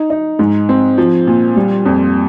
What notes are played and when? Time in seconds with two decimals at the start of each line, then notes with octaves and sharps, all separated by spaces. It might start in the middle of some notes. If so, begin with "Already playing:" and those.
Already playing: D#4
0.10 D#4
0.39 G#2
0.69 C4
0.98 F3
1.27 A#2
1.56 G3
1.85 F2